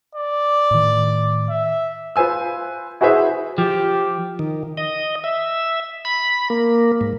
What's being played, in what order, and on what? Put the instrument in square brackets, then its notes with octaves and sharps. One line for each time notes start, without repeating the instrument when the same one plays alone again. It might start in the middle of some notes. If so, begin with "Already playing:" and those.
[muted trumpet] D5
[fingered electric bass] A2 D#3
[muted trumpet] E5
[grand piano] F4 B4 C5 G#5 E6
E4 F#4 G#4 B4 C5 E5
[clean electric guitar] F3 [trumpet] G4
[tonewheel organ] D#3
D#5
E5
B5
A#3
G#2